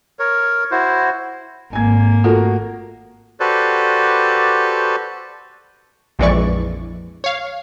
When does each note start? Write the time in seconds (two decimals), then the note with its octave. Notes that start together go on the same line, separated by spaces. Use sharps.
0.19 A#4 C#5
0.71 E4 F#4 C5
1.73 G#1 A#3 G#5 G#6
2.24 A3 F4 F#4 A4 A#4
3.40 F#4 G4 A4 B4 C5 D5
6.19 A#1 F2 E3 G#3 D5 C#6
7.24 C#5 F5